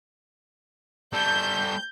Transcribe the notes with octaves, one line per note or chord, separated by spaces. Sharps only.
G3 A4 G6